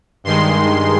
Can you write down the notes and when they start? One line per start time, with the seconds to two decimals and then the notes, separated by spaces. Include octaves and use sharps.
0.24 G2 D#3 G#3 C6